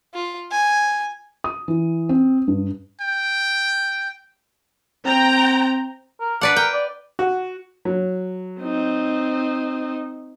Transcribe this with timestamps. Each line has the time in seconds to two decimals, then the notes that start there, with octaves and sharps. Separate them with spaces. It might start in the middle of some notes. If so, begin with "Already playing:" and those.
0.14 F4
0.51 G#5
1.44 D#6
1.68 E3
2.09 C4
2.48 G2
3.01 G5
5.06 C4 G5 A#5
6.20 A#4
6.41 D4 B4 D5 F#5
6.56 A#4 G5
6.73 D5
7.19 F#4
7.85 F#3
8.62 C4 D#4